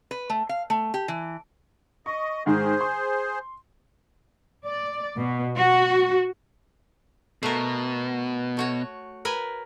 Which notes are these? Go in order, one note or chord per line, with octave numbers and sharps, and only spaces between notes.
B4
A3
F5
A3
G4
E3
D#5 C#6
G#2 D#3 G#4 C5
C6
D5
B2
F#4
B2 A3 A#4
A3 F#4 C#5
A#4 B4 G#5